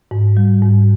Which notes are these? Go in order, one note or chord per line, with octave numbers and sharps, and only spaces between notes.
G#2
G3
G#2